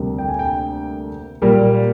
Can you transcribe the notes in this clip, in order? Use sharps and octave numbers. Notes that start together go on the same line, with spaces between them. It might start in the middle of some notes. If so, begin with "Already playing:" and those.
Already playing: D2 C3 G3 A#3
G5
G#5
G5
A#2 G3 A#3 A#4